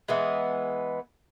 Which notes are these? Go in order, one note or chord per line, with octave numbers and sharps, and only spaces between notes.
E3 G#3 B3